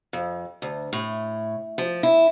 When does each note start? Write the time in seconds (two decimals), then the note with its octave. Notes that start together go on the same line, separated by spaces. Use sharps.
0.13 F2
0.62 D2
0.93 A2
1.78 F3
2.03 E4